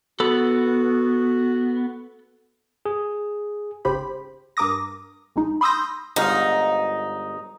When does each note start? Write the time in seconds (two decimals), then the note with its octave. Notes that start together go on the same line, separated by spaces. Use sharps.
0.20 B3 F#4 A4 B5
2.86 G#4
3.85 G#1 C#3 G4 C5 B5
4.57 G2 A#4 D6 D#6 A#6
5.36 A#1 G#3 D#4
5.61 B5 C6 D#6 E6 G6 A#6
6.16 G1 G#2 D#4 F5